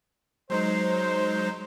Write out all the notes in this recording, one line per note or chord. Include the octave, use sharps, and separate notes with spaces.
F#3 G#3 D#4 C5